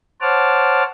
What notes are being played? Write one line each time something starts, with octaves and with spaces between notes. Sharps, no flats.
C5 C#5 F#5 A5 D6 F6